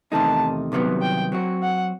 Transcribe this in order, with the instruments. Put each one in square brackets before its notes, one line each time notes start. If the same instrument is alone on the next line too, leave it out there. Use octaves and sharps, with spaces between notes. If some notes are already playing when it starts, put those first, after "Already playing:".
[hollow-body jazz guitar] E2 C3 D#3 A3 D#4 [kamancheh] A5
[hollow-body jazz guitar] C2 C3 D#3 F#3 B3
[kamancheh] G5
[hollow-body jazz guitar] F#3 C4 F#4
[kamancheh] F#5